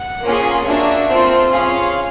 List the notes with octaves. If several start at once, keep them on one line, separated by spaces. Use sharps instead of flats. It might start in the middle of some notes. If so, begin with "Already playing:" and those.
Already playing: F#5
A#3 C#4 F4 G#4
A#3 D4 F#4 E5
C4 F4 A4
C#4 F4 G#4 F5